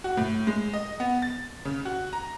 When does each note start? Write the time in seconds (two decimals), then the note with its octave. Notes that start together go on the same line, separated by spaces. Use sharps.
0.04 F#4
0.17 A2
0.47 G#3
0.74 D#5
1.00 B3
1.22 A6
1.65 C#3
1.85 F#4
2.13 A#5